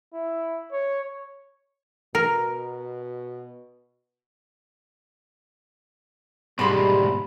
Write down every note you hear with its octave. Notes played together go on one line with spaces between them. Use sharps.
E4
C#5
B2 A#4
G#2 B2 G3 G#3 B5 C6